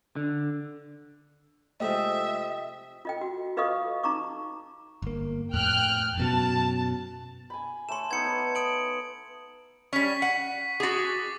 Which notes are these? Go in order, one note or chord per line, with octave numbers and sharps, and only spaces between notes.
D3
C3 F3 G#3 A3 D#5 E5 G5 D#6
F4 D#5 G5
F#4
F4 B4 D#5 F5 C#6 D#6
D#4 A#5 C#6 D6
G1 A#3
F2 A2 G5 F6 F#6
F#2 B2 F#3 A5
G#5 B5
A3 C#5 C6 E7
B3 D#4 A4 G#6 C#7
B4 C#5
D#6 D7 F#7
G3 C#4 C#6 B6
F#5
F#4 G#4 D6 A6